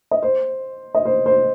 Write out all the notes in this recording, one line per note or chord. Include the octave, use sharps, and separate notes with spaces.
D#5
C5
D#5
C5
C5